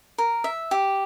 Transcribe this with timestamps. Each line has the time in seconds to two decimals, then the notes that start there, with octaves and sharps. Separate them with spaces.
0.18 A#4
0.44 E5
0.71 G4